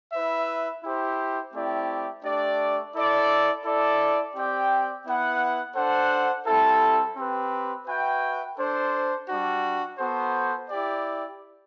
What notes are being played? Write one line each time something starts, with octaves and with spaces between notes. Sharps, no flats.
E4 B4 E5
E4 G4 C5
A3 C4 E4 G4 D5
A3 D4 G4 D5
E4 A4 D5
E4 A4 D5
C4 G4 D5 G5
B3 E4 B4 F#5
D4 A4 C5 F#5
G3 C4 E4 A4
C4 G4 B4
F#4 B4 E5 G5
D4 A4 C5
G3 D4 F#4
B3 F#4 A4 C5
E4 G4 D5